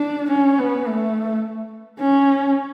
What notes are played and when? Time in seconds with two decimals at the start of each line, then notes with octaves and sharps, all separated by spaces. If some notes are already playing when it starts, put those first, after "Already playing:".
Already playing: D4
0.31 C#4
0.59 B3
0.87 A3
2.00 C#4